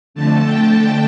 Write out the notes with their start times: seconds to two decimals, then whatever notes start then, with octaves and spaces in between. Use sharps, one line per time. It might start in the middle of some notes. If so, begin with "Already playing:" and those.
0.14 F2 D3 A3 A5
0.44 G5
0.72 A5